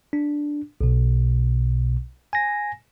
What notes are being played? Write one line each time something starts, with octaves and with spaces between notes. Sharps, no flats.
D4
B1 B2
G#5 A#6